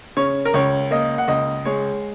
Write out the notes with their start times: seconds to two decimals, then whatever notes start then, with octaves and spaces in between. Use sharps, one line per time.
0.17 C#3 C#5
0.45 A#4
0.54 C#2 C#5
0.91 A#3 D#5
1.18 F#5
1.28 C#2 D#5
1.65 G#3 C#5